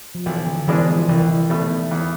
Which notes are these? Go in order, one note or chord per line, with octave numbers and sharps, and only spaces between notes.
F3
B1 E3
D3
B2 E3 G#3 D4
F3
C2 E3
B2 A3
E2